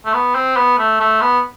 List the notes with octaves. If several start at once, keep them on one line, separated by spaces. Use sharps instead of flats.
A3
B3
C4
B3
A3
A3
B3